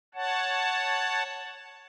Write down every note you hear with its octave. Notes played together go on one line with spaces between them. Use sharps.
C#5 F#5 A5